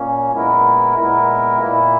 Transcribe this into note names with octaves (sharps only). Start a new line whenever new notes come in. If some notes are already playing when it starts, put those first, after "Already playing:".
Already playing: A#2 A#3 C#4
A#2 G#3 B3 E4 A#4
A#2 G#3 B3 E4 A#4
A#2 A#3 E4